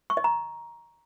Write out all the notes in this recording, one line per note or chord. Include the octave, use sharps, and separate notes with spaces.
C#6
D#5
A#5